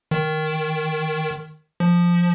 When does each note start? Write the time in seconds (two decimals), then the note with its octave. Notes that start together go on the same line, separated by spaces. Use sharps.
0.11 D#3
1.80 F3